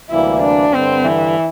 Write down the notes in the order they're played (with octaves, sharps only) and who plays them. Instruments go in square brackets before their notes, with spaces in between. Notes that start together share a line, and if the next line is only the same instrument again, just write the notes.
[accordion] D2 C3 E3 G3 A#3 [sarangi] E4
[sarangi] D4
[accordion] G2 D3 G3 [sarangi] C4
[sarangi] E3